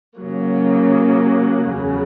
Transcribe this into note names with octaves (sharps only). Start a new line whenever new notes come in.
C#3 F#3 A#3
E2 C#3 F#3